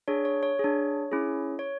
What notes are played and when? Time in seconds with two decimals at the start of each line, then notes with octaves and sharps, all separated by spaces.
0.08 D4 G#4 C#5
0.25 C#5
0.43 C#5
0.59 D4 G#4
1.12 C#4 E4 G#4
1.59 C#5